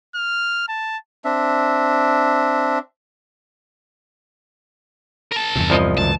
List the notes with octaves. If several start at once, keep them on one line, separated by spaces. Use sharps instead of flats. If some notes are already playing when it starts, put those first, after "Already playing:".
F6
A5
C4 D4 E5
A#4 A5
E2 G2 C3
C2 F3 D#5
C#2 F#2 E3 A5